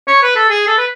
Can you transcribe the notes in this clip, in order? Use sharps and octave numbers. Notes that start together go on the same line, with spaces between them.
C#5
B4
A4
G#4
A4
B4